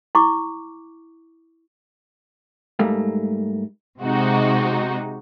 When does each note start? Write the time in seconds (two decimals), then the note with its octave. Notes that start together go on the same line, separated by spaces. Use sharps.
0.15 E4 C#6 D6
2.79 G#2 G3 A3 A#3
4.02 C3 G#3 D#4 F#4